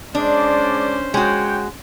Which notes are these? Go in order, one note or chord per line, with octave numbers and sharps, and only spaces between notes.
G#3 C#4 D4 C5 D5
G#3 F#4 C#5 G5